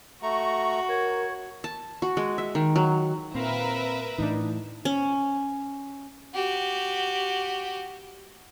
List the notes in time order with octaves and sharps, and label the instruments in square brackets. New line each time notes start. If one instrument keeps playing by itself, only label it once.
[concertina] A3 A#5 C#6 [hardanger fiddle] F#4
[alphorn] A#4 [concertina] C#5
[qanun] A5
F#4
G#3
E5
D#3
F#3
[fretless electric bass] A#2 [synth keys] C4 F5 A#5 [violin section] A#4 B4 E5
[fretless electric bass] A2 E3 [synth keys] D4 D#4
[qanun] C#4
[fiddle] F#4 G4